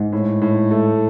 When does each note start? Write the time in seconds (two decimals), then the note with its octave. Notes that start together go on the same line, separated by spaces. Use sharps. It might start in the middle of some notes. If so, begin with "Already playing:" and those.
Already playing: G#2
0.13 A2
0.42 A2
0.71 A3